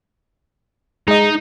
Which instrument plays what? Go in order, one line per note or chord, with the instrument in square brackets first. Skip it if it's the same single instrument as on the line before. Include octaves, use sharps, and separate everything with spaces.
[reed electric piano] G#3 D#5 [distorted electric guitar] D#4